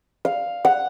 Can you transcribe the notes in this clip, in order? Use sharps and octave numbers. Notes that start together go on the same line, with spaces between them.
F5
F#5